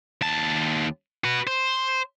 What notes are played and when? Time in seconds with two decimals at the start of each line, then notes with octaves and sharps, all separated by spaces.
0.21 D#2 A5
1.24 F#4 B4
1.47 C5